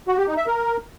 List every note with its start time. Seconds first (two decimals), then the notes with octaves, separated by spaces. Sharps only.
0.08 F#4
0.18 G4
0.27 D#4
0.37 E5
0.47 A#4